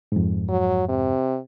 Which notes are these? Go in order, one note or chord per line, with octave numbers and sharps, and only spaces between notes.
F2 G#2
F#3
C3